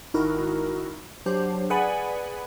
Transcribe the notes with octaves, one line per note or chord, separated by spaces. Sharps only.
G#1 D#4 E4 F#4 A#4
F#3 D4 G4 C5
G#4 B4 D5 F#5 G#5 B5